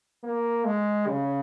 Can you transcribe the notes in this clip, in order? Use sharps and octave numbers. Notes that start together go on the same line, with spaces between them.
A#3
G#3
C#3